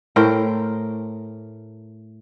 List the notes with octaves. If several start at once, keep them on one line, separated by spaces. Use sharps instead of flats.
A2 A#4 C5 G5